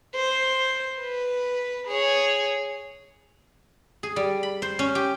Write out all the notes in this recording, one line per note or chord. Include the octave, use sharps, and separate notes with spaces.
C5
B4
G#4 C#5
G#4
G3
B5
C5
C#4
G4